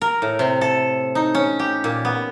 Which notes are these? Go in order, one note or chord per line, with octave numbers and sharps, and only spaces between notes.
A#4
A2
C3
A4
D#4
C#4
G4
A#2
B3